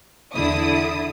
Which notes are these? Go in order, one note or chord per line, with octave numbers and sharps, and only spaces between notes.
E2 D3 E4 D#6